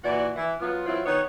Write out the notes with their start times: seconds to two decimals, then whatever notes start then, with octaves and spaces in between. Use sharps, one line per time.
0.04 A#2 E3 F#4 D5
0.36 E3
0.60 F#3 B3 F4
0.86 E3 F#3 C4 E4 F4
1.05 D#3 B3 C#5